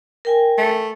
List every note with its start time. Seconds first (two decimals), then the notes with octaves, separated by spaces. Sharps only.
0.25 A#4 G5 G#5
0.58 A3